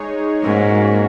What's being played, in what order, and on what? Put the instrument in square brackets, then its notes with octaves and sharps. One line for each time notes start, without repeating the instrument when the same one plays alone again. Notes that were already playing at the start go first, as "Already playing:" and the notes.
Already playing: [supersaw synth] G#3 D#4 G#4 C#5
[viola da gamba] G#2 [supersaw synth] A#3 C#4 F#4 A#4 C#5